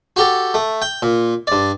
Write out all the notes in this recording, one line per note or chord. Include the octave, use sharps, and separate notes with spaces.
F#4 G4 A4
A3
G5
A#2
G2 D5